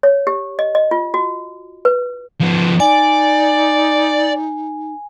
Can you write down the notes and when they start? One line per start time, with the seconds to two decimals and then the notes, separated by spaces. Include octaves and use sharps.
0.03 C#5
0.27 G4
0.59 D#5
0.75 D#5
0.91 F4
1.14 F#4
1.85 B4
2.40 F3 B3
2.80 D#4 D5 G#5